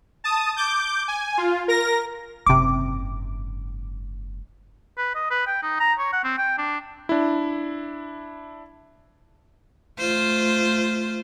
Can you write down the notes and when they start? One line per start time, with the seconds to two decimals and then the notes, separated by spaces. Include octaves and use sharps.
0.24 A5 D#6
0.56 D6 G6
1.08 G#5
1.38 F4
1.68 A#4 A#6
2.46 F#1 G#2 C3 D6
4.98 B4
5.15 D#5
5.30 B4
5.47 G5
5.63 D#4
5.80 A#5
5.99 C#5
6.13 F#5
6.24 C4
6.38 G5
6.58 D4
7.09 D4 E4
9.99 A3 F4 C5